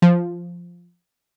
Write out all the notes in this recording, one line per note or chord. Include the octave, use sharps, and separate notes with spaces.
F3